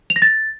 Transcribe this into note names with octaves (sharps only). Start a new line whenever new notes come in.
F7
A#6
A6